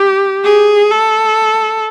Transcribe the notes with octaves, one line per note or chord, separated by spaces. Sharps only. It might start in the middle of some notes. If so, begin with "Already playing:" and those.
Already playing: G4
G#4
A4